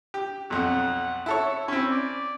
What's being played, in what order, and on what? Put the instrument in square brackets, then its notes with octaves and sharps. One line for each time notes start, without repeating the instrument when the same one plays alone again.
[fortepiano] G4
[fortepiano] B1 F2 [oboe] F#5
[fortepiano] E4 A4 C#5
[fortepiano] C4 C#4 [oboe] E4
[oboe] D5